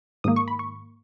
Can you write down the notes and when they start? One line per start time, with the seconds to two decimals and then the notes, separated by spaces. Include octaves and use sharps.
0.24 G#2 D#3 A#3 D#6
0.36 C#6
0.48 B5
0.59 C#6